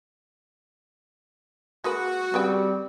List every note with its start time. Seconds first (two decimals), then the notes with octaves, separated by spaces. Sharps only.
1.84 G#3 A#3 F#4 B4
2.34 C#3 G3 C4 B4 G5